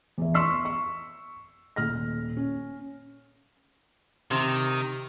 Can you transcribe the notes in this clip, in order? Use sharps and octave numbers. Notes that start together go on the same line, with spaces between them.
E2 E3
C6 C#6 E6 B6 C7
C#6
D#1 F6 A#6
C#4
C3 D#3